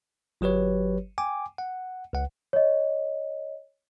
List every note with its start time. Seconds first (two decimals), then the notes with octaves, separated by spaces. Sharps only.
0.41 G1 F#3 G4 B4 C#5
1.18 G5 G#5 D6
1.58 F#5
2.13 C#2 F#5
2.53 C#5 D#5